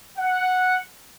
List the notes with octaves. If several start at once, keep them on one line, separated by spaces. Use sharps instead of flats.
F#5